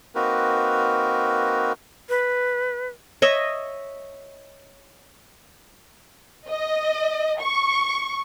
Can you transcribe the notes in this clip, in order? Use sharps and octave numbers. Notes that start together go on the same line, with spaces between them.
A#3 C4 D#4 F#4 A#4 B4
B4
C#5 D#5 E5
D#5
C#6